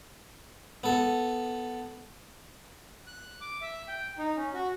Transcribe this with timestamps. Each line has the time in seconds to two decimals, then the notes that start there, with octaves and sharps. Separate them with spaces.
0.84 B3 A4
3.07 F#6
3.41 D6
3.62 E5
3.88 G5
4.18 D#4
4.36 C#4
4.54 F#4